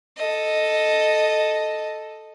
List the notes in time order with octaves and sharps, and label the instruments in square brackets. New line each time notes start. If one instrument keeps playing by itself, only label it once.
[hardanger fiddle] A4 D#5